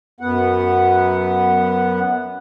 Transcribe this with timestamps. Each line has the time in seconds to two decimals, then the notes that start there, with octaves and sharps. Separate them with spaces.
0.20 F#2 B3 F#5